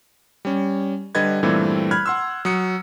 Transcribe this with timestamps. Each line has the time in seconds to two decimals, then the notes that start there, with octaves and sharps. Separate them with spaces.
0.45 G3 C#4
1.15 D3 G3 B4 D#5 G#6 A6
1.43 G2 A#2 E3 G3 A3 C4
1.91 B5 F6 F#6 G#6
2.06 F#5 C6 E6
2.45 F#3 D#6 C#7